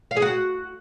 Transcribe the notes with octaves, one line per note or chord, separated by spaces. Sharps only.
F5
G#4
F#4